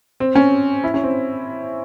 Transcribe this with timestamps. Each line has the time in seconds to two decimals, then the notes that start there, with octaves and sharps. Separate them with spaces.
0.20 C4
0.35 C#4
0.84 E4
0.94 C#4
1.04 C4